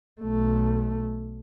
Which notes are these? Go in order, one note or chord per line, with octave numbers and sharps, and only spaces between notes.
B1 A3